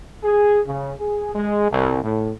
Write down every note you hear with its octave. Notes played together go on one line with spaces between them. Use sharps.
G#4
C#3
G#4
G#3
C2
A2